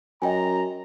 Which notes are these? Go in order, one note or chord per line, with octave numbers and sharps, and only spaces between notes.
F#2 D#5 G5 G#5 A#5